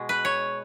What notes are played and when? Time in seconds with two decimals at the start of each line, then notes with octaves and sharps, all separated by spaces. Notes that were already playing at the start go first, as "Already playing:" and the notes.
Already playing: B2 G#3
0.09 B4
0.25 C#5